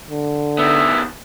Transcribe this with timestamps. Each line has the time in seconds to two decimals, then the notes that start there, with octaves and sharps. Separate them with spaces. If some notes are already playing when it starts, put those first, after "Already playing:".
0.10 D3
0.59 D#3 B3 E5